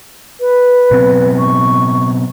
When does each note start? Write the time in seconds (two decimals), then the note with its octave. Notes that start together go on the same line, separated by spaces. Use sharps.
0.40 B4
0.91 B2 F#3 C4
1.39 C#6